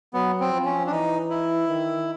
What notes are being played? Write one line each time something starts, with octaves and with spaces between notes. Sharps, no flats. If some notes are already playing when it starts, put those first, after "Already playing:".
F#3 B3
C4
F3
C#4
D4
E3 D#4
E4
D#3